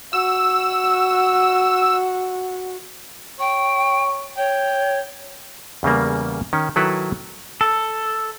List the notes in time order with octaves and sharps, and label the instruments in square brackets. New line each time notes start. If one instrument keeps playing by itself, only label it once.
[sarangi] F#4 [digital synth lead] E6
[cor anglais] C#5 [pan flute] G5
[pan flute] C#5 [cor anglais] G5
[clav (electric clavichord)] E2 C#3 G3 A#3
D#3 C#4
D#3 F#3 E4 A4 B4
[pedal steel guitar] A4